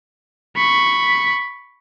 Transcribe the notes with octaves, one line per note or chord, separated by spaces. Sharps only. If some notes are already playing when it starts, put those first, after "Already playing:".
B5 C#6